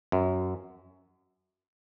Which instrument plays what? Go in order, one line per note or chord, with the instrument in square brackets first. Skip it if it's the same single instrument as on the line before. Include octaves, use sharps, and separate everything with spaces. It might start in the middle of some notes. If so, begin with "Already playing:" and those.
[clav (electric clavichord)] F#2